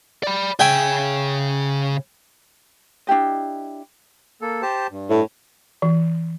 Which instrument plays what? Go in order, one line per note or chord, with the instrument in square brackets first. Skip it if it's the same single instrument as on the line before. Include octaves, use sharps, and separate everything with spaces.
[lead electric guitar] D5 B5
[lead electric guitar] C#3 G#4 [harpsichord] E5 G5 G#5
[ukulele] D4 E4 G4 D#5
[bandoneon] A#3 A4
G4 C5 A5
G2
[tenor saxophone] A2
[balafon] E3